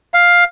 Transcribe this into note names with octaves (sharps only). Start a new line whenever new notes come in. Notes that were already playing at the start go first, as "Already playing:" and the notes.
F5